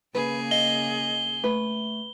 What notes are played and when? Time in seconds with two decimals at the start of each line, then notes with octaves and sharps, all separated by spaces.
0.15 C#3 A#3 G#4 B4
0.51 D#5 F5 G7
1.44 A3 B4